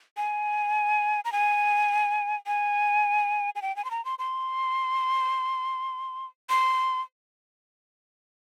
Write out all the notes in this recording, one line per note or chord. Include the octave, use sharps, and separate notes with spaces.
G#5
A#5
G#5
G#5
G#5
G5
G#5
C6
A#5
C6
C6
C6